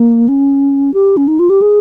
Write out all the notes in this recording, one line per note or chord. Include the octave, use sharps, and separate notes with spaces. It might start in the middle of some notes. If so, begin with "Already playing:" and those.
Already playing: A#3
C#4
G4
C#4
D#4
F4
G4
G#4